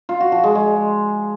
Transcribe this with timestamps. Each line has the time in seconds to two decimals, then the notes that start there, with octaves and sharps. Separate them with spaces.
0.09 F4
0.20 F#4
0.32 F3
0.44 G#3
0.55 G#3